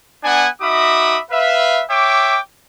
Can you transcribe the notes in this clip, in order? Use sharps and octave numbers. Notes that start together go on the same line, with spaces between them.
B3 D4 F#5 G#5
D#4 F#4 E5 B5 D6 D#6
B4 E5 F5
C#5 E5 G5 D6